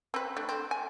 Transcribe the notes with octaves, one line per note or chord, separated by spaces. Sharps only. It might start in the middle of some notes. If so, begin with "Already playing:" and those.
C4 B4
A3 D4
C4
G#5